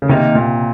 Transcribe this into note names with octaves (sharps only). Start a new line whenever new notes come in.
C#3
C3 D#3 A#3 D#4
A#2